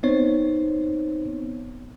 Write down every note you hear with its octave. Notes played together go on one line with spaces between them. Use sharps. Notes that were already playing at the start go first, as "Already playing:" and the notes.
B3 C4 D#4 C5 C#5